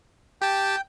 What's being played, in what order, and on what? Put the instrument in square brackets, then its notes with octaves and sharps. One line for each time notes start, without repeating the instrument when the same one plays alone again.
[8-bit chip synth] G4 A5 [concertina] G5